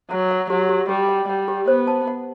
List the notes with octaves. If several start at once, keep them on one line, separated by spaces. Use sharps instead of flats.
F#3 F#5
F#5
F#3 G4
G4
G3 G4
F#5
G3 F#5
G4
B3 C5
A5
F#5